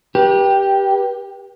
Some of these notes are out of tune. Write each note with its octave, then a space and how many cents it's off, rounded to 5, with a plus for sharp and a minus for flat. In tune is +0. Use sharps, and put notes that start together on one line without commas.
G4 +0 B4 -40